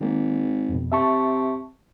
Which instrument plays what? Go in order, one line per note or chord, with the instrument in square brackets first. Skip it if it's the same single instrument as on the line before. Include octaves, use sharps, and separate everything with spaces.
[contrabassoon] G#1 [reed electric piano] D#3 G#3 A#3
[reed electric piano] F2 B2
[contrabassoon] C3 [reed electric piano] E5 A5 C#6